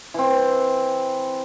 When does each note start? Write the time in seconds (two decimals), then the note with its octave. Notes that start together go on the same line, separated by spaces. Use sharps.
0.14 E3 C4